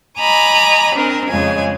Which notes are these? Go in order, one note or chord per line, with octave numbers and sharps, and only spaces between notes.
D#5 G#5 A#5 B5 D6
C4 D4 A#4
F2 C#3 G#3 G#5